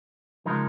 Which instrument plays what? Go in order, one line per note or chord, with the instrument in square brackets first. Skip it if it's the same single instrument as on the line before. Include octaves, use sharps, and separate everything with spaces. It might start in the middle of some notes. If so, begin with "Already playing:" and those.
[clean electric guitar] C#3 F3 G#3 D#4 A#4